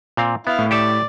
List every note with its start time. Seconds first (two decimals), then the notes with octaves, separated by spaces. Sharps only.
0.17 A#2 C4 F5
0.47 B3 E4 F5
0.59 A2
0.71 G4 A4 D5 E5